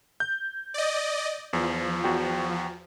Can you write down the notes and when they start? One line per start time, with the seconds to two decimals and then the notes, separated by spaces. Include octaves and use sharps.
0.20 G6
0.74 D5 D#5
1.53 E2 F3
2.04 E2 F#4 G5